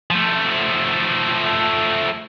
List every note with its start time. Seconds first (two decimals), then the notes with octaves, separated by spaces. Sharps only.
0.10 F3 A3